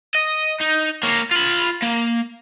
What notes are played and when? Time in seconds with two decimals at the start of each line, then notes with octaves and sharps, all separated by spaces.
0.15 D#5
0.61 D#4
1.03 A#3 C#5
1.31 F4 B5
1.83 A#3